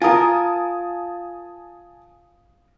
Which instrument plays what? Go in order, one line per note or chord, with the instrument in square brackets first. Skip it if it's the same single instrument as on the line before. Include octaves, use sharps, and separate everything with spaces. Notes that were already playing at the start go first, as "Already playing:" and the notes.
[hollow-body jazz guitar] F4 A#4 [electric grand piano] G#5 A5 D#6